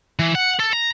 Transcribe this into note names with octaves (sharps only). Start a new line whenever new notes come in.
E3
F#5
A4
A#5